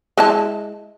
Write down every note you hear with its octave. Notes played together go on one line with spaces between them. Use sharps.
G#3 E4 A5